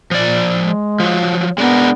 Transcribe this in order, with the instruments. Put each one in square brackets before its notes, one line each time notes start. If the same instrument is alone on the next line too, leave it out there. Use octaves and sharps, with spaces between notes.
[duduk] A#2 [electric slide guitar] F3 D5
[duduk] G#3
[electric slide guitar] F3 F#3
[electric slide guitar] G#3 D4 A#4 [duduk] B3